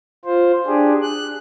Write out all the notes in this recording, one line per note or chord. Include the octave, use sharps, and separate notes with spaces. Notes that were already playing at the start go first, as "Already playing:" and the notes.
F4 C5
D4 G4 G#4
F#6